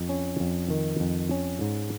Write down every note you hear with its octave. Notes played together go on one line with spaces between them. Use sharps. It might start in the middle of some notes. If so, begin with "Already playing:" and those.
Already playing: F2
C#4
F2
D#3
F2
C#4
G#2